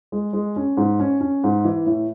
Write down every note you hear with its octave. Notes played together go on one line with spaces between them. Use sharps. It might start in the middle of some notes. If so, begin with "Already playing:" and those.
G#3
G#3
C#4
G#2
C#4
C#4
G#2
E3
A2